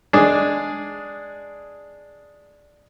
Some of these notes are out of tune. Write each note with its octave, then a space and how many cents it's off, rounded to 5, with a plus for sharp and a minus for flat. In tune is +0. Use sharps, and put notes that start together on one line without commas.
G#3 +0 D4 +0 G#4 +0